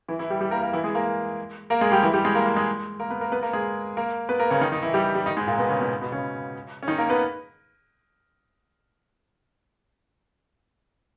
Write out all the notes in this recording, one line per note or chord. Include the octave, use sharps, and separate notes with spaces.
E3 E4
E3 E4
G3 G4
G3 G4
A#3 A#4
A#3 A#4
E3 E4
G#3 G#4
A#3 A#4
A#3 A#4
G#3 G#4
G3 G4
E3 E4
G3 G4
G#3 G#4
A#3 A#4
A#3 A#4
G#3 G#4
A#3 A#4
B3 B4
A#3 A#4
B3 B4
A#3 A#4
G#3 G#4
A#3 A#4
B3 B4
A#3 A#4
C#3 C#4
D#3 D#4
D#3 D#4
E3 E4
G3 G4
G3 G4
D#3 D#4
G#2 G#3
A#2 A#3
B2 B3
C#3 C#4
B2 B3
B2 B3
C#3 C#4
C#4
D#3 D#4
A#3 A#4
B3 B4